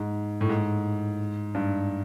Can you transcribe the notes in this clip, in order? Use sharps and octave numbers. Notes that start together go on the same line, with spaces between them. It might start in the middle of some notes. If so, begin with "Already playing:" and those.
Already playing: G#2
A2
G#2
G2